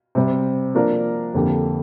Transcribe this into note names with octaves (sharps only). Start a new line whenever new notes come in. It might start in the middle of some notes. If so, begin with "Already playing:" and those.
C3 G3 C4
F3 A#3 D4 A#4 D5
F2 D3 A#3 G4